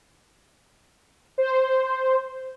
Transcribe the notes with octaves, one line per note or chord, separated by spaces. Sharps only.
C5